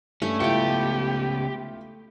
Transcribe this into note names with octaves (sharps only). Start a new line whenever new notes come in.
G2 A3 C#4
C#2 B3 E4 F4 G4 G5 A5 C#7